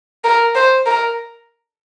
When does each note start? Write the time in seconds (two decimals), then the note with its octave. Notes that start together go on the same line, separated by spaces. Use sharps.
0.24 A#4
0.55 C5
0.86 A#4